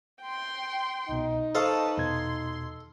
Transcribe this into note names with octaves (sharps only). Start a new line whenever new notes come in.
G5 C6
C2 B2 D#4
A4 B4 C5 D#5 F5 A5 C#6
E2 B2 C6 G#6